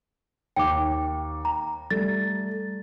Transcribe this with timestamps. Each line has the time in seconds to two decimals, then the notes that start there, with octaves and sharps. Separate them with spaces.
0.56 D#2 G5 D6
1.45 A#5
1.91 G3 A3 A6